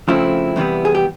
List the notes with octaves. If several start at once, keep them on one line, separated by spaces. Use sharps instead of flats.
F2 C#3 F3 A3 C4 E4
E2 C3 E3 G3 B3
G#4
G4